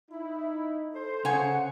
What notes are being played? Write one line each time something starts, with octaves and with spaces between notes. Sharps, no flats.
D#4 E4
A4 C5
C#3 C#5 F#5 G#5